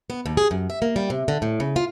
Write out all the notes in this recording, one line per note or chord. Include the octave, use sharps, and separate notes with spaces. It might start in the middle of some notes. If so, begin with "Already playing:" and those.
B3
D#2
G#4
F#2
E5
A#3
G3
C3
D3
A2
C#3
F4